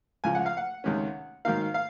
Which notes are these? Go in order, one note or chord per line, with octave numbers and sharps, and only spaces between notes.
C#2 C#3 F3 G#5
F#5
F5
F#5
C#2 C3 D#3 G#3 C#4
G#2 D#3 F#3 A#3 D#4 F5
F5